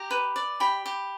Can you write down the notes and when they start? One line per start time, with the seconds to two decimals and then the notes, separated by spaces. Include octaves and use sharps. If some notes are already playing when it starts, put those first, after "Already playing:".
Already playing: G4 A#5
0.11 B4
0.36 D5
0.60 G4 G5 B5
0.86 G4